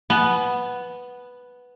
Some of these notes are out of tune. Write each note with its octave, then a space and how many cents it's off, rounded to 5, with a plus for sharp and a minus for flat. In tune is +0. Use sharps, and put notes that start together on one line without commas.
B3 +0 G#5 +45